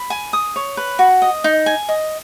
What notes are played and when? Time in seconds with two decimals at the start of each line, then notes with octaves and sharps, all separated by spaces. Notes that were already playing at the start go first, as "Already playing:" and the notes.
Already playing: B5
0.10 G#5
0.33 D#6
0.56 C#5
0.77 B4
0.99 F#4
1.22 D#5
1.44 D#4
1.66 G#5
1.89 D#5